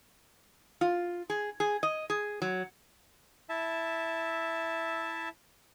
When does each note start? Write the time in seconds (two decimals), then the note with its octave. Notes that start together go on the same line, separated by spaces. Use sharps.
0.81 F4
1.30 G#4
1.60 G#4
1.83 D#5
2.10 G#4
2.42 F#3
3.49 E4 E5 A5